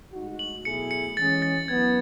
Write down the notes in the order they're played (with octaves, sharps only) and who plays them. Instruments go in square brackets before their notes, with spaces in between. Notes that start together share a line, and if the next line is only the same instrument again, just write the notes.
[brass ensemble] A2 G#3 D#4 F#4
[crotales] F#7
[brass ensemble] B2 F#3 A3 E4 G#4 [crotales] C#7
[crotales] C#7
[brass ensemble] E3 G#3 C#4 G#4 [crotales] A6
[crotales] A6
[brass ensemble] F#2 E3 B3 [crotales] G#6